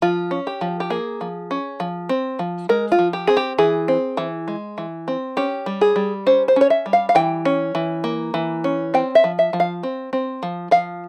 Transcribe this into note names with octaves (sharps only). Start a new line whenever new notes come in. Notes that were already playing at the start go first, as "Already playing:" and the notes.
F3 F4
C#4
G4
F3
G4
A#3 G#4
F3
C#4
F3
C4
F3
G#3 A#4
F4
F3
G4
C4 G#4
G4
E3 G#4
C4
E3
G#3
E3
C4
C#4 G4
G3
G#4
G3
C#4 C5
C5
C#4 C#5
E5
G3
F5
F5
E3 G5
C#4
E3
A#3
E3
C#4
C4 G5
E5
F3
E5
F3
F5
C4
C4
F3
F3 F5